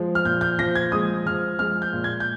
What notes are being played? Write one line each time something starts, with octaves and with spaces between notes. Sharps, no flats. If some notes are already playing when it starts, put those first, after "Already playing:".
Already playing: F3 G#3
F6
A#2 G6
G6
F3 A#6
G#6
G#3 D#6
F3 F6
G#3 F6
G6
A#2
G#6
G6